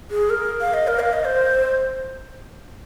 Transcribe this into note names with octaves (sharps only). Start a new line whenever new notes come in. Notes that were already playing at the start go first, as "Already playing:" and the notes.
G#4
A#4
F5
D#5
A#4
F5
D#5
C5